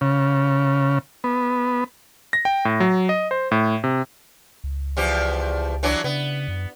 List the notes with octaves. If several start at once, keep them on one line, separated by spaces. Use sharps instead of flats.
C#3
B3
A#6
G5
A2
F#3
D#5
C5
A2
C3
C#2
E2 F3 G4
E3 F#3 D4
C#3 B3
F#2